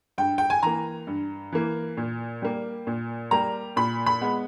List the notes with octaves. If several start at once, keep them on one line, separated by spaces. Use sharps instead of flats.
G2 G5
G5
G#5
E3 A#3 A#5
G2
E3 A#3
A#2
G3 A#3
A#2
G3 A#3 A#5
A#2 B5
B5
G#3 B3